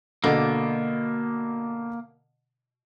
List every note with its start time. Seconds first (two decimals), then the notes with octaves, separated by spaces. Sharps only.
0.24 B2 D3 A#3